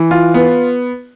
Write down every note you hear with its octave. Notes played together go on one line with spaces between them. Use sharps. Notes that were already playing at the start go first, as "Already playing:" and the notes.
Already playing: E3
F4
B3